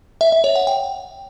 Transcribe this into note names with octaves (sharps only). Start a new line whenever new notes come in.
E5
E5
C#5
F#5
G5